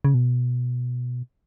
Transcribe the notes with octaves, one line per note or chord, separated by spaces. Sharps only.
C#3
B2